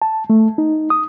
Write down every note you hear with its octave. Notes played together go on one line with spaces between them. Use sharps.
A5
A3
D#4
D#6